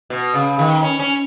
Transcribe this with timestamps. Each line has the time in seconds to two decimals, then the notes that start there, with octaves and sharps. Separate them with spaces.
0.10 B2
0.34 C#3
0.59 D#3
0.82 C#4
0.99 C#4